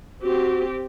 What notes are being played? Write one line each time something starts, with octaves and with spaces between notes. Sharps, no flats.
C4 F#4 G4